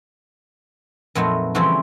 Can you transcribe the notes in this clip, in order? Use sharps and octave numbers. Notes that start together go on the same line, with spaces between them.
F2 A#2 F#3 A3 B3 D#4
C#3 E3 F3 G3 C4 F#4